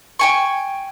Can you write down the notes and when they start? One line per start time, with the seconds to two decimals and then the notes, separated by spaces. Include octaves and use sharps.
0.19 G5 G#5 C#6